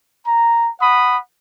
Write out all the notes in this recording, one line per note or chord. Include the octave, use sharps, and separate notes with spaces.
A#5
F#5 B5 D#6